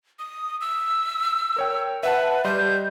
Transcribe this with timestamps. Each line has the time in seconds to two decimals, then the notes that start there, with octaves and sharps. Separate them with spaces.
0.19 D#6
0.61 E6
1.56 A#4 C#5 G5
2.03 B4 E5 F#5 A5
2.45 G3 D#5 C6 G6